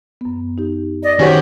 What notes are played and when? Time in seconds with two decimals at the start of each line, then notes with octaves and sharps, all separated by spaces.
0.21 F#2 B3
0.58 D#4 G4
1.03 D5 D#5
1.19 D#3 C#4 F#4 G4 C5 F#5 G#5